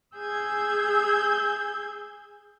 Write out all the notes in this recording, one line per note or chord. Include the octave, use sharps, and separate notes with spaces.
G#4 E6 G6 G#6